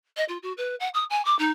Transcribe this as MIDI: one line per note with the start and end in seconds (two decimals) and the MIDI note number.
0.16 0.24 75
0.28 0.38 65
0.42 0.52 66
0.57 0.75 71
0.80 0.88 78
0.94 1.04 87
1.10 1.23 80
1.25 1.37 86
1.38 1.51 63